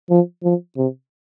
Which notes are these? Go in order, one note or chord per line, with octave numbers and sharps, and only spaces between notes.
F3
F3
C3